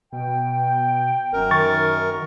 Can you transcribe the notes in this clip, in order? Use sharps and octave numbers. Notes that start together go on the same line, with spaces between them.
B2 G5
D#1 F#2 A#4
D#3 C#6 A6